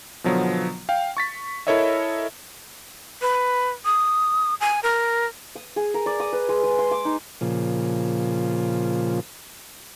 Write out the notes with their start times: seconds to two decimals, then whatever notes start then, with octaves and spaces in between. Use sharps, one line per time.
0.24 B2 D3 F3 F#3 B3
0.89 F5 G5
1.17 C#6 A6 B6
1.67 E4 A4 A#4 C#5 D#5 E5
3.21 B4
3.85 D#6
4.61 G#5
4.83 A#4
5.55 D#6
5.76 G#4
5.94 A#4
6.06 D5
6.20 D#6
6.33 B4
6.49 G#3
6.63 G#3
6.78 C6
6.91 D6
7.05 D#4
7.41 A#2 C#3 F3